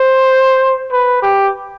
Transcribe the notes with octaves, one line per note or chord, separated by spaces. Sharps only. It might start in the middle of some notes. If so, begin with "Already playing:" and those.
Already playing: C5
B4
G4